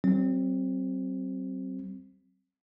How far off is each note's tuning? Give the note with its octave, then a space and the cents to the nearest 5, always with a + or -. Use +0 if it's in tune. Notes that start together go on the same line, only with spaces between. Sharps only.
F#3 +45 C4 +10